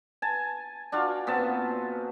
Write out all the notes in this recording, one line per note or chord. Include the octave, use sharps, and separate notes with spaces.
G#5 A5
D4 F4 F#4 F5
A#2 B3 C4 A5